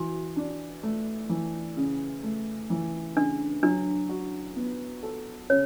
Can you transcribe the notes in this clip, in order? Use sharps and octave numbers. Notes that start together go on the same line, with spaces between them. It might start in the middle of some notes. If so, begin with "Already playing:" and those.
Already playing: E3 F#4
D4
A3
E3
C#3
A3
E3
C#3 D4
F#3 D4
F#4
B3
A4
C#3 C#5